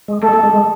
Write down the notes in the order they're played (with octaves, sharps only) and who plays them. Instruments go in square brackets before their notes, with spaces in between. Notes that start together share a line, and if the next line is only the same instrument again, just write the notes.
[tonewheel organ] G#3
[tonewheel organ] A3 [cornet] A4
[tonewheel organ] G#3
A3
G#3
G#3